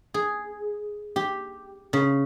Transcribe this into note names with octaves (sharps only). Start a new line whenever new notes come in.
G#4
G4
C#3